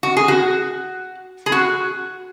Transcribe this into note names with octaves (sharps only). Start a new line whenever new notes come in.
F#4
G#4
F#4
G#4
F#4